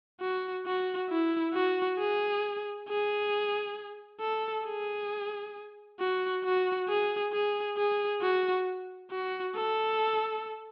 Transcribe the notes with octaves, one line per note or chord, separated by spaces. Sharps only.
F#4
F#4
E4
F#4
G#4
G#4
A4
G#4
F#4
F#4
G#4
G#4
G#4
F#4
F#4
A4